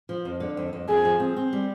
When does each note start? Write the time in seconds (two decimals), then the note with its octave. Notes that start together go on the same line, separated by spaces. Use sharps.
0.09 F3
0.25 F2
0.40 D3
0.57 F2
0.73 F2
0.88 F2 G#4
1.05 F3
1.20 C4
1.36 C4
1.53 G3